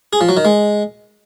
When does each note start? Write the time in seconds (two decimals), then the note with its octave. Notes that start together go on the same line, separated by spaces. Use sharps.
0.13 G#4
0.21 F3
0.29 F#3
0.37 D#3
0.45 G#3